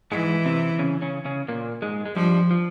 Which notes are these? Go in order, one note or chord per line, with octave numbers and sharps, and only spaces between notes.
G#2 E3 G#3
C3 C4
C#3 C#4
C#3 C#4
C#3 C#4
A#2 A#3
G#2 G#3
G#3
G2 F3 G3
F3